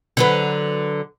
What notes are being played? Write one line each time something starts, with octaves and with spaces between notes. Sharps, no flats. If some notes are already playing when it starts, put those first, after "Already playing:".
D3 F#3 B4